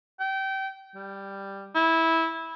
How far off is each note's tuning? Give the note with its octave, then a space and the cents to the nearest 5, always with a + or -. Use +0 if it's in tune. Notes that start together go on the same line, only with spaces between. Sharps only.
G5 -25
G3 +5
E4 -15